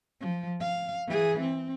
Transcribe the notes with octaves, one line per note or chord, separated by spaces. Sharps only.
F3
F5
E3 G#4
C4